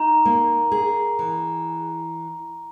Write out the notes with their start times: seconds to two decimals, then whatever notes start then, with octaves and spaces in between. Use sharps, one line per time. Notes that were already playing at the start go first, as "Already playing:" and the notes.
Already playing: D#4 A#5
0.25 A#3
0.72 G#4
1.19 E3